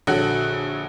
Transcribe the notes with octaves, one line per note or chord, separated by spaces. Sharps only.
A#1 D3 F#4 C#5 F#6